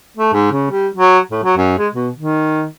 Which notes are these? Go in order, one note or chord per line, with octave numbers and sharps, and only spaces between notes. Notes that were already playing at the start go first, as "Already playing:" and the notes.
A3
G#2
C#3
G3
F#3
A2
F#3
F#2
G#3
B2
D#3